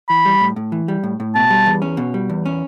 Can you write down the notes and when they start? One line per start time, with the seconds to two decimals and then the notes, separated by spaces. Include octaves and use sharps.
0.09 E3 B5
0.25 G3
0.41 A2
0.56 A2
0.72 E3
0.88 G3
1.03 A2
1.20 A2
1.35 B2 A5
1.50 G3
1.66 E2
1.82 C#4
1.97 B2
2.14 G3
2.30 E2
2.45 C#4